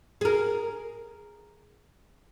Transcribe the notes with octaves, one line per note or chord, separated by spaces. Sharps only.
G#4 A#4